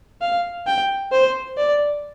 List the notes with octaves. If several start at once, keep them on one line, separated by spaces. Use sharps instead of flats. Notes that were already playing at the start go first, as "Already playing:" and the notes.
F5
G5
C5
D5